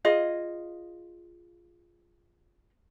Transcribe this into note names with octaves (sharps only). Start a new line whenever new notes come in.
F4 G#4 D#5